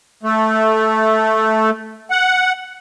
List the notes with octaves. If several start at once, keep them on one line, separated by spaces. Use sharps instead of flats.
A3
F#5